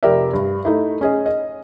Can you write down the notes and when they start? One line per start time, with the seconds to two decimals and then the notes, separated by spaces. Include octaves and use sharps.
0.03 F1 G4 A#4 D5 E5
0.33 G2
0.65 A3 D#4 E4
1.01 C#4 G#4 D#5
1.26 D#5